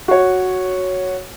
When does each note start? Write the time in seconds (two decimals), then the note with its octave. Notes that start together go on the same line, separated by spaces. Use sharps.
0.08 F#4 C#5